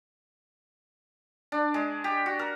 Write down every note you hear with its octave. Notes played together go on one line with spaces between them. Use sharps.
D4
G#3
G4
F#4
A#4